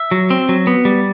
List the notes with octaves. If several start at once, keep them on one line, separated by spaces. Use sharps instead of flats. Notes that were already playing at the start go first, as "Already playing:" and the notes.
Already playing: E5
F#3
C4
F#3
B3
G3